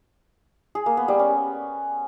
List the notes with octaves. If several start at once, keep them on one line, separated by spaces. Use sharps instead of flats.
G#4
A#3
B3
G3
C#4